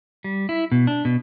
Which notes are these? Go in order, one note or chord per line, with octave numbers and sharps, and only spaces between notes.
G3
E4
B2
D4
B2